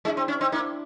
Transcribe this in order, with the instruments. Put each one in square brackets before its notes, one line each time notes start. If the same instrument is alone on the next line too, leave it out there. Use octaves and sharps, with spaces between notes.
[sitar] G#3 [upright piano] D4 E4
[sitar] C4
[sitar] C#4 [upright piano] D4
[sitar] C4 [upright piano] D#4
[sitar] A#3 [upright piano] D4 E4